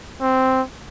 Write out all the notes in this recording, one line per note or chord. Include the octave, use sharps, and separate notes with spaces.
C4